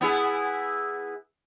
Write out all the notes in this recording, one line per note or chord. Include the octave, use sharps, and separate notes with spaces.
B3 E4 G#4